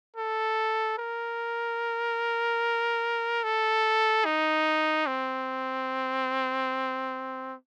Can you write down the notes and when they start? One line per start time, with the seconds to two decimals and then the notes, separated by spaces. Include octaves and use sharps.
0.17 A4
0.98 A#4
3.44 A4
4.25 D#4
5.07 C4